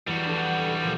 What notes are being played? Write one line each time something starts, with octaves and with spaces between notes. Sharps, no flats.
E2 G3 F#4 C#7
D4 A4
F#5
B1
A#2 F3